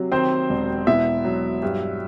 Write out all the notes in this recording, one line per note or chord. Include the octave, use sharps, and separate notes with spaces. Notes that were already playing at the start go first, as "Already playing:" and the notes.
Already playing: C3 F#3
D#3 C4 C5
E1
B2 E4 E5
F#3
G2